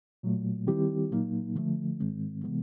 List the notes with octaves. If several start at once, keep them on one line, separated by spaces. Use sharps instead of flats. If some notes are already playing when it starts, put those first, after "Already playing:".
A#2 F#3 A3
D#3 G3 C4 E4 G4
A#2 F#3 A#3 D#4
D3 F3 A3
G#2 D#3 G#3 C4
C3 E3 G#3 B3